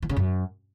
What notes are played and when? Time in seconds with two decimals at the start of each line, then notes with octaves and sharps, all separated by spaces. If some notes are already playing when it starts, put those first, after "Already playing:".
0.02 E3
0.09 C#3
0.16 F#2